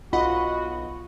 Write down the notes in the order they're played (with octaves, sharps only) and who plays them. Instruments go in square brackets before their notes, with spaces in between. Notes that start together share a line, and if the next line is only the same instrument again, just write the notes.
[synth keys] B1 D#5 F#5 [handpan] F4 [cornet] F#4 [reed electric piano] B5